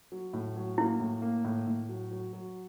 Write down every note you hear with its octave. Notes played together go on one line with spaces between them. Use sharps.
F#3
A2
F#3
A#3 E4
A2
A#3
A2
A2
F#3
F#3
F#3